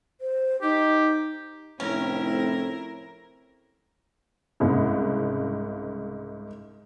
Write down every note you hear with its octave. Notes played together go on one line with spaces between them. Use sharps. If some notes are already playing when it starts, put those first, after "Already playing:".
C5
D#4 G4
F1 A2 C4 C#4 E4 A#4
C2 G#2 C#3